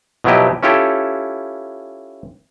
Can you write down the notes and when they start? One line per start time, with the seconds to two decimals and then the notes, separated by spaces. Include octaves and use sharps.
0.24 B2 F3 F#3 E4 G4 D#5
0.63 C#4 E4 F4 G4 A4